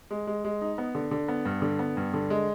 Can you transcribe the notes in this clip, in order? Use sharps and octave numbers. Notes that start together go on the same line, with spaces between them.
G#3
G#3
G#3
D#4
B3
D3
D3
B3
G2
D3
B3
G2
D3
G#3